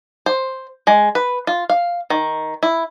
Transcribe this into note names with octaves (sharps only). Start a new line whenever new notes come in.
C5
G#3
B4
F4
F5
D#3
E4